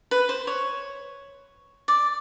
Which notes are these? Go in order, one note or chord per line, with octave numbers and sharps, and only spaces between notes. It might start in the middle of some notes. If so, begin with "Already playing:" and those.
B4
C5
C#5
D5